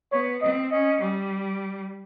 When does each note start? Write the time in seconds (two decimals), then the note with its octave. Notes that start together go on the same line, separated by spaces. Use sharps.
0.12 B3 C#5
0.42 C4 D#5
0.71 C#4 D#5
1.01 G3